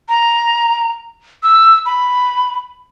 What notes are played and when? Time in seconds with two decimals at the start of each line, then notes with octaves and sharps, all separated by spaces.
0.09 A#5
1.43 E6
1.86 B5